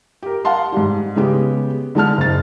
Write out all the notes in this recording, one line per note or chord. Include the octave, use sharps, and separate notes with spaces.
G4 A#4
F5 F#5 A5 C6
G#2 G3
C#3 G#3 B3 G4
D3 G#3 A5 F6
F#1 A6